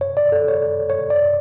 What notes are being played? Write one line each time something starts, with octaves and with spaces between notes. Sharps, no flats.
C#5
D5
A4
C#5
C#5
D5